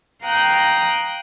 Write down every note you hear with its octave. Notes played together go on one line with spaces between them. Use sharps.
F5 G5 A#5 D#6 F#6